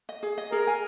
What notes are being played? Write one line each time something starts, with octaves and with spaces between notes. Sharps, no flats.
D#5
G#4
D#5
G#4 A#4
G#5